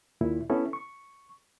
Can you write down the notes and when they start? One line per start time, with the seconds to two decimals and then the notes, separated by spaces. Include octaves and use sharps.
0.21 D#2 A#2 E4
0.50 B3 C#4 E4 A4
0.73 C#6